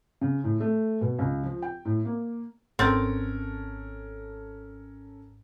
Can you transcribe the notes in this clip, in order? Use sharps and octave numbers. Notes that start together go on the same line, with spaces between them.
C#3
A2
A3
B2
C#2
F3
G5
A2
A#3
G#1 C4 C#4 A4 A#4 A6